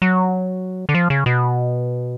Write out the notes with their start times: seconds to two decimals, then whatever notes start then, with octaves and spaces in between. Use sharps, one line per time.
0.02 F#3
0.89 D3
0.95 F3
1.10 C#3
1.26 B2